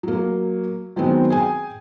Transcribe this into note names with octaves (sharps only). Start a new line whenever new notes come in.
F#3 A#3
D#3 F#3 G#3 B3 C4
G#4 G5 G#5